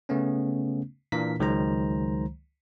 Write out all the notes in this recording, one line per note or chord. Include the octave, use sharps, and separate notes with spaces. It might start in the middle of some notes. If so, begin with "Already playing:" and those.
C#3 A3 B3 C#4
A#2 E3 A#3 D4 A#4 B6
C#2 D#3 F#3 G#3 C5 A#5